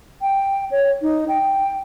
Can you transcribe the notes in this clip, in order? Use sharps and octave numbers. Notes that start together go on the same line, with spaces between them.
G5
C#5
D#4
G5